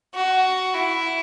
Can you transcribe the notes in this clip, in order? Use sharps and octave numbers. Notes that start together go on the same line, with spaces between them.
F#4
E4